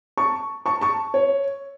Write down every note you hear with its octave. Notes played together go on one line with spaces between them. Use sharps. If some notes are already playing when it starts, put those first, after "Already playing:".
A5 C#6
A5 C#6
A5 C#6
C#5